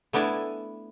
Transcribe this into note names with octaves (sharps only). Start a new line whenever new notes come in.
A3 B3 D4 E4 D5 G#5